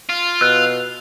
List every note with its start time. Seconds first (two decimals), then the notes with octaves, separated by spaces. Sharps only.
0.10 F4
0.41 B2 E6 F#6